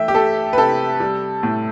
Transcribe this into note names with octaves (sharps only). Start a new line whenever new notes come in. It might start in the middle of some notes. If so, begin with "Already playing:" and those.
Already playing: E3 A3 E5 G5
G4
A3 A4
B4
C3 A4
G3
A2